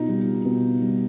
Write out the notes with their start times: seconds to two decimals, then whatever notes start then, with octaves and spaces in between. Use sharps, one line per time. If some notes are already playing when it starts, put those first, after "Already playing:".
Already playing: B2 D#4 F4
0.09 G3
0.45 B2
0.82 G3